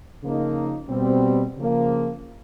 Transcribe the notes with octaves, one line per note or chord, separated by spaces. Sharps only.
C#3 F3 A#3 D#4
B2 G3 C4
C#3 F3 A#3